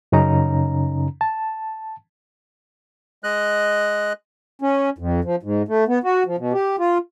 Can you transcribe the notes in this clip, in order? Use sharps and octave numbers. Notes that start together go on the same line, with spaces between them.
F#2 C#3 C#4 D#4 A#5
A5
G#3 D#5 F#6
C#4
F2
F3
G#2
A3
B3
F#4
F3
B2
G4
F4